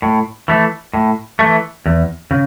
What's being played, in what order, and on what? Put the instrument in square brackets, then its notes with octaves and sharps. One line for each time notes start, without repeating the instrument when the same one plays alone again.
[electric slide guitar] A2
E3 A3
A2
E3 A3
E2
C#3